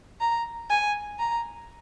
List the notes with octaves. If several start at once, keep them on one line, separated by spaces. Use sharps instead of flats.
A#5
G#5
A#5